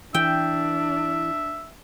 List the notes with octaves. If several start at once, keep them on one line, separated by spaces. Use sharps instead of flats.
E3 D4 E5 G5